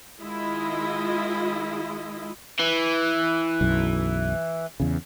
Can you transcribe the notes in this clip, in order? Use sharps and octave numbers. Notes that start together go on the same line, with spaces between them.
D#3 G#3 E4 F4 D#5
E3
B1 F#2
E2 C#3